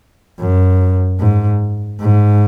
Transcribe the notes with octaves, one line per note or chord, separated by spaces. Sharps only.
F#2
G#2
G#2